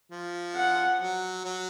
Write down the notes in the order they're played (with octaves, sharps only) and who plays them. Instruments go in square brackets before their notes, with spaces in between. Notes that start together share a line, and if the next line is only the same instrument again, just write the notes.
[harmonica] F3
[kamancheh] F#5
[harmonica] F#3
F#3